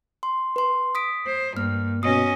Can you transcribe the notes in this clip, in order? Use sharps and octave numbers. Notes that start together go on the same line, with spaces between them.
C6
B4 C6
D#6 B6 D7
C5
G2 A#3 F6
B2 C#4 D#5 D#6